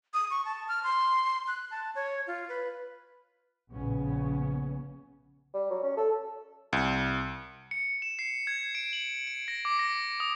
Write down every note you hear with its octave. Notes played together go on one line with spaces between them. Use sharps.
D#6
C#6
A5
F6
C6
F#6
A5
C#5
F4
B4
A#1 C#3 B3 C#4
G3
F#3
C#4
A4
C2
C#7
E7
C7
G#6
D7
F#7
D7
A#6
D6
A#6
D#6